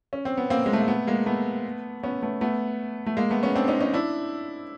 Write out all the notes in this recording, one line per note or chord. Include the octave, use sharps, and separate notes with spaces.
C#4
C4
B3
A#3 C4
G#3
A3
A#3
A3 B3
G#3 A#3
A3 B3
B3 C#4
A3 B3
A3 B3
A3
G#3 A#3
A3 B3
B3 C#4
C4 D4
C#4 D#4
C#4 D#4
D4 E4